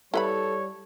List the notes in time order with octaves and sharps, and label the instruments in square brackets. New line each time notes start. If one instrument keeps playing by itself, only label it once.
[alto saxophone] G3 [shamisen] E4 B4 B5 [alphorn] A4 [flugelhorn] C#5